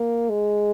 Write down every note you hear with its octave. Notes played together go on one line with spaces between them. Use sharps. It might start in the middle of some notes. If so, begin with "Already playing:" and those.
Already playing: A#3
G#3